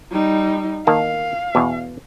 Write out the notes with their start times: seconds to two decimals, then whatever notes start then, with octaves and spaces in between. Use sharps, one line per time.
0.12 G3 D#4
0.87 D#3 A#3 F5 A5
1.55 E2 B2